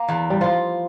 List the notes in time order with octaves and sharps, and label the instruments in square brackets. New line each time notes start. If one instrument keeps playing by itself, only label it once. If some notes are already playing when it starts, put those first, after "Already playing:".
Already playing: [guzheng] A#3
E2
[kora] G3
[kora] F3 [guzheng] F4